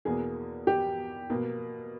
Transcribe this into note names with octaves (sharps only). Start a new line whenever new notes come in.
E2 B2 A#3 G#4
G4
B2 A#3